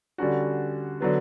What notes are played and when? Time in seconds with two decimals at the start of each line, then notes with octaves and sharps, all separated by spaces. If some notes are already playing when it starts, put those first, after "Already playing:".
0.18 D3 G3 C#4 F#4
1.00 D3 F#3 B3